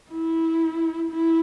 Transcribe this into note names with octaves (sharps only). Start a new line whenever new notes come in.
E4
E4